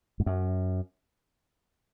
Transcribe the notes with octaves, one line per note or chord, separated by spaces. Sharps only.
G#2
F#2